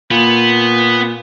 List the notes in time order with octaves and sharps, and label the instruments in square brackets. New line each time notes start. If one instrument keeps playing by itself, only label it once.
[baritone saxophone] A#2 [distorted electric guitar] B3